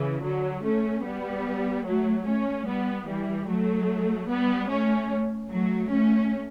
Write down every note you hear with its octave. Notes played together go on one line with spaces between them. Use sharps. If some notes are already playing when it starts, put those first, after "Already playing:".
Already playing: C#3 E3
D3 F#3
A3 C#4
G3 B3
F#3 A3
A3 C#4
G3 B3
E3 G3
F#3 A3
G3 B3
A3 C#4
F#3 A3
A3 C#4